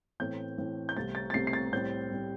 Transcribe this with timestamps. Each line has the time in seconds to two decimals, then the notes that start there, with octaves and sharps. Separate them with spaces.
0.20 A2 E3 A3 C4 G6
0.58 A2 E3 A3 C4
0.89 G6
0.96 C2 C3 A3 C4 A6
1.15 A6
1.30 A6
1.34 C2 C3 A3 C4 C7
1.47 C7
1.53 A6
1.72 A2 G3 C4 G6
2.12 A2 G3 C4